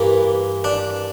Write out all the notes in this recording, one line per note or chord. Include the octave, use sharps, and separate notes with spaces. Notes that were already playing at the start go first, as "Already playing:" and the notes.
Already playing: G2 E3 A#3
D4